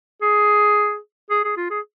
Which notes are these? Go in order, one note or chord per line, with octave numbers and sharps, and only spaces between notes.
G#4
G#4
G#4
F4
G#4